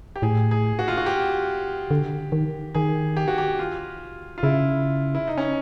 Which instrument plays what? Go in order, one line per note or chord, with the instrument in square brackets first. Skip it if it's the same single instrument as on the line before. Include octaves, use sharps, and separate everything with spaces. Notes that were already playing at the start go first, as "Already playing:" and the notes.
[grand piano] G4
[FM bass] A2 [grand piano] G#4
[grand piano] G#4
F#4
F4
F#4
G4
[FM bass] D3
D#3
[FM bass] D#3 [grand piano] G#4
[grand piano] G4
F#4
G4
F4
F4
[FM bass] C#3 [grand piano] E4
[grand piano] E4
D#4
C#4